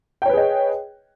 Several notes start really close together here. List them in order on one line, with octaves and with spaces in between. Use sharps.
G5 C#5 B4 G#4 D#5